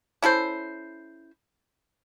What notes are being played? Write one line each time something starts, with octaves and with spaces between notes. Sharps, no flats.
C#4 E4 A4 C5